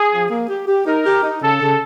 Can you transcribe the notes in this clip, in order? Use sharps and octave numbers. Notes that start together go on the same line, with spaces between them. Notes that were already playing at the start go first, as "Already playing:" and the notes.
Already playing: G#4
F3
A#3
G4
G4
D#4 A#4
G4
D#4
C#3 A4
C#3